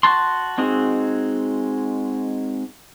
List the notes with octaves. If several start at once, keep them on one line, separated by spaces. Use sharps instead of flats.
F#4 A5 C6
G#3 C4 D#4 F#4 G#4